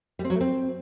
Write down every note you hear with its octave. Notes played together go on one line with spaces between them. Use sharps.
G3
C4
F#3
A3
C4